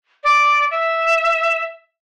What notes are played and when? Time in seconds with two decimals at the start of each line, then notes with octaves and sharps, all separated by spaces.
0.24 D5
0.71 E5